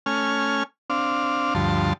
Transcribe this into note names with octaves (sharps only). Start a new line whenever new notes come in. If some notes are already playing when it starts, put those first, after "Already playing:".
A3 C#4 G#5 F6
C4 D4 F5
D2 G2 F3 A5 C6